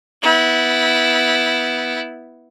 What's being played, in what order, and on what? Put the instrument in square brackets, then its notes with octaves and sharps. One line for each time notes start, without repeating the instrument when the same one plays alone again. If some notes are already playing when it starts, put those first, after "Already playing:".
[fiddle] B3 E4